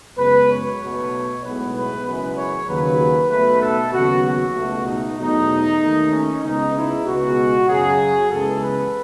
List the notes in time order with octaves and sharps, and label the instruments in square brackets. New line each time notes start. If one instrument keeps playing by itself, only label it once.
[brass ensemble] F#2 C#3 G#3 B3 B4
C#5
B1 B2 F#3 A3
B1 A2 G#3 B3 B4
B4
F#1 F#2 E3 G#3 B4
C#5
D#2 C#3 F#3 B4
B1 B2 A3 B4
A4
D#2 C#3 F#3 B3 F#4
F#4
C#2 B2 A3
D#4
E2 B2 F#3 A3 D#4
D#2 D#3 A3
C#4
C#2 C#3 G#3 B3 D#4
E4
C#2 B2 G#3 B3 F#4
F#2 C#3 F#3 G#4
C#2 C#3 E3 G#3 B3 A4
B4